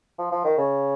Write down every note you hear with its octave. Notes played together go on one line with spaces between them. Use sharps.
F3
F3
D#3
C#3